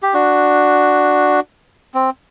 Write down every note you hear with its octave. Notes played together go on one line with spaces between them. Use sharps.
G4
D4 F#4
C4